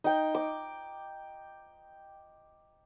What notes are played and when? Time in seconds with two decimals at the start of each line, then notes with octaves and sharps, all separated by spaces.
0.04 D#4 G5
0.35 D6